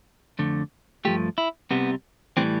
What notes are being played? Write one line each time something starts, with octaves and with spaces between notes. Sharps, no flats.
F2 D3 A3
G2 F3 A3 G4
E4
C2 C3 G3 B3
A2 E3 G3 C4